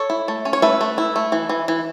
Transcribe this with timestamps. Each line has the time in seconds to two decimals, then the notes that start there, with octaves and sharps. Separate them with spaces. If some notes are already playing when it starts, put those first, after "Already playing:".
Already playing: A4 C#5
0.10 E4
0.28 A3
0.45 C#4
0.53 C#5
0.62 A3 B4 E5
0.81 A3
0.98 E4
1.16 A3
1.32 E3
1.49 E3
1.68 E3